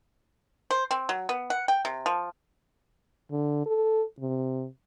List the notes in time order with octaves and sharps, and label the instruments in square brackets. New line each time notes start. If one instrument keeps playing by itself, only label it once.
[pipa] C5
C4
F#3
B3
F#5
G5
C3
F3
[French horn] D3
A4
C3